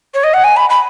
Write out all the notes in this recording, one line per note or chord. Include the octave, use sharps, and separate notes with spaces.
C#5
D#5
F#5
G#5
B5
B5